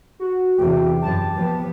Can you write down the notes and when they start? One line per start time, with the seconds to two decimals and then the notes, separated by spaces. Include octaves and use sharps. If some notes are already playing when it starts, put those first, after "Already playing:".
0.20 F#4
0.59 E2 C3 G4
1.02 F#2 A5
1.35 F3 B3